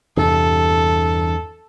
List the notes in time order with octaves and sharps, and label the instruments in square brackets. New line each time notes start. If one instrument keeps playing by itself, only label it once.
[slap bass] E2 G2 C3 [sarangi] A4